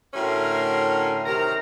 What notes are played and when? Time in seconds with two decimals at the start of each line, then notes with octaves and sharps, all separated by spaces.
0.14 A2 D3 C#4 F#4 A#4 C6
1.25 C3 D#3 A#4 A#5